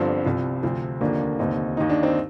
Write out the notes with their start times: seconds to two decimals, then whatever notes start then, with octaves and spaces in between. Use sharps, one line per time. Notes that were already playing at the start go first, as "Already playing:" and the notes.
Already playing: G1 G2 D3 F3 C4
0.25 C2 C3 F3
0.63 D2 C3 F3 C4
1.01 F1 D#2 D3 F3 A#3 D4
1.39 F1 D#2 D3 C4 D#4
1.77 D#2 D#3 D#4
1.89 D4
2.03 C4 D#4